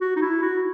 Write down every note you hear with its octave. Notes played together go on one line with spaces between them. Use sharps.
F#4
D#4
E4
F#4